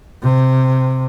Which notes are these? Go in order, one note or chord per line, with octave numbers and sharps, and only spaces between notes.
C3